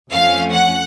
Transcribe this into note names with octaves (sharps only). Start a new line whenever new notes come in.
F2 F3 A3 C#4 F5
F#5